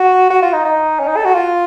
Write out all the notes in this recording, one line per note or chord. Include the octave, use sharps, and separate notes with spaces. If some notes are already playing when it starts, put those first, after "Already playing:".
Already playing: F#4
F#4
F4
D#4
D#4
C#4
D#4
A4
F#4
F4